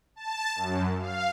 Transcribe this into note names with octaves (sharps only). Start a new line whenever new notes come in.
A5
F#2
F5